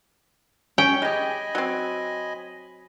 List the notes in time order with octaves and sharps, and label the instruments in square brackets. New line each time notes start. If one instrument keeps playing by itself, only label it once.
[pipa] C#4 [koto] G5
[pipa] G#3 G4 [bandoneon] D#5 G#5 B5
[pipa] F#3 C4